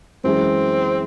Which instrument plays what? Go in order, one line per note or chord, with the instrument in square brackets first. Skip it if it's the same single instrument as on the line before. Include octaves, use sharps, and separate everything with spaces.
[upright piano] F#2 E3 G#3 [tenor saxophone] C4